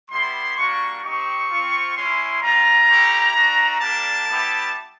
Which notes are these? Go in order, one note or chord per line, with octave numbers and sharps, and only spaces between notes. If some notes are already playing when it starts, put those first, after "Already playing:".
G3 B3 E4 G4 C6
G3 A#3 D4 F#4 C#6
C4 D#4 G4 C#6
C4 F4
G#3 C#4 E4 C6
G3 C4 F4 A#5
A3 C#4 E4 G4
A3 D4 F#4
G3 A#3 D4 G4 A5
G3 B3 E4 G4